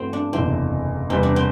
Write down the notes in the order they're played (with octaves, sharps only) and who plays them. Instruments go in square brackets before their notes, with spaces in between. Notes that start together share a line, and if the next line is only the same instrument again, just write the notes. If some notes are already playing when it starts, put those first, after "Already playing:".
Already playing: [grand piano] G2 E3 B3 F#4 [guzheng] A3 C4
[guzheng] D4
[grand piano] F#1 E2 C3 E3 [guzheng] C4
[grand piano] E2 C3 G3 B3 [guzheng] C4
[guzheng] D4
C4